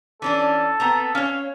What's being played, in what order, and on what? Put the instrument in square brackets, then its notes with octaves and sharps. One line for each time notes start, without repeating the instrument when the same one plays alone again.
[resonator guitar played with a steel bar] E3 C#4 D4 [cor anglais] A4
[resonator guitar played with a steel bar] B3 C4 A#5
[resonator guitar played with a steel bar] C#4 C#5 [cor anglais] F5